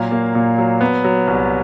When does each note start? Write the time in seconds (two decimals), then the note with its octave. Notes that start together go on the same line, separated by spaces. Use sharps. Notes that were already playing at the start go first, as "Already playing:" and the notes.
Already playing: A#2 F#3 F5
0.12 A#3
0.35 A#2
0.58 F#3
0.81 B3
1.04 F#3
1.27 C2